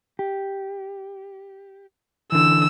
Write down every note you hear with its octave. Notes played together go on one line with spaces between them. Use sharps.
G4
D3 E3 E6